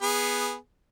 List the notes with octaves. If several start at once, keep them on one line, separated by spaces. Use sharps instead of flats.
B3 G#4